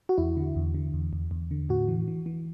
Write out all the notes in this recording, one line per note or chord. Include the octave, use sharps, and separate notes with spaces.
F#4
E2 E4
D3
E2
D3
E2
E2
E2
D3
A2 F#4
E3
E3
E3